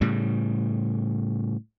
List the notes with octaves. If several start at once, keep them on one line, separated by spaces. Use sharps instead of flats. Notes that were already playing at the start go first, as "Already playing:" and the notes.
A2 C#3 G3